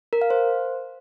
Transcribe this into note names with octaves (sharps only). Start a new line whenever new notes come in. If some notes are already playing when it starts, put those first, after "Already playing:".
A#4
F5
C5